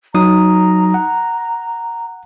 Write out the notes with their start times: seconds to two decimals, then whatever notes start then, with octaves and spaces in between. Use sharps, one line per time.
0.15 F#3 D#4 A#5 D#6
0.94 F#5